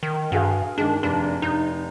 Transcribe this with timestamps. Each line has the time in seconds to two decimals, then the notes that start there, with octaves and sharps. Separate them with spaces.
0.03 D#3
0.32 G2 F#4 G#4 F5
0.78 D#3 G#3 D4
1.03 F1 D4
1.42 F1 D#4 G6